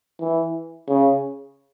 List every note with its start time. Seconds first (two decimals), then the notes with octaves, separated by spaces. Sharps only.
0.20 E3
0.88 C#3